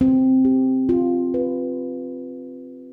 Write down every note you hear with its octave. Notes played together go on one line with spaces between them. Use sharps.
C4
G4
F4
B4